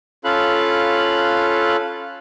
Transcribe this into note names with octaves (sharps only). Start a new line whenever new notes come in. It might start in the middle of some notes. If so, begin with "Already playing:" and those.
C#4 F4 A4 F5 B5 F#6